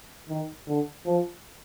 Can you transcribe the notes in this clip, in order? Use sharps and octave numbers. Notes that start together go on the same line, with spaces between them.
D#3
D3
F3